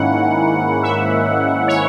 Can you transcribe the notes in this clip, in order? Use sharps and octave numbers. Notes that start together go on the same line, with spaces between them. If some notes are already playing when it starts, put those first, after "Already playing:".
Already playing: G#2 D#3 A#3 C#4 E4 F#5
E5
C#5